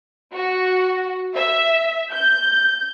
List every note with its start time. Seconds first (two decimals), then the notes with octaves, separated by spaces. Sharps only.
0.35 F#4
1.35 E5
2.12 G6